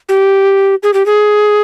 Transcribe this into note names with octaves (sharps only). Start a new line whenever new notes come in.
G4
G#4
G4
G#4